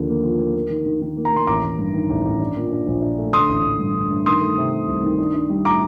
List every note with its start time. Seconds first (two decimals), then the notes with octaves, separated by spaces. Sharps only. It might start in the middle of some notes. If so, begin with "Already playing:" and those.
Already playing: D#2 D3 F3
0.09 A#3
0.23 F3
0.39 A#3
0.55 A#3
0.70 D#3
0.86 D#3
1.01 D#3
1.17 A#3
1.25 A#5
1.32 A#3 C6
1.47 A1 A#5 D6
1.63 A1
1.78 G2
1.93 D#3
2.10 A1
2.25 A1
2.40 D4
2.57 A#2
2.71 D4
2.87 A#1
3.02 D4
3.18 A3
3.33 D3 C6 D#6
3.49 A1
3.64 A1
3.79 G2
3.95 D3
4.11 G2
4.26 D#3 C6 D#6
4.41 A3
4.57 C3
4.73 C3
4.87 C2
5.03 D#3
5.18 D4
5.34 D4
5.50 G3
5.65 A2 A#5 D6